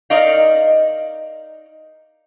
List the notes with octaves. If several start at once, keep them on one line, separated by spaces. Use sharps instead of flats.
D#4 A#4 D5 D#5 F5